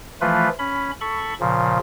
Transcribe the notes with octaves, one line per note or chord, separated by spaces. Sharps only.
E3 F3 A3 F4 B4
C#4 B5
A4 B5 C#6
A#2 C#3 F3